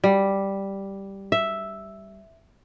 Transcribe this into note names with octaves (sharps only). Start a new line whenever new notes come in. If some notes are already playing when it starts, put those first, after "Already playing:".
G3
E5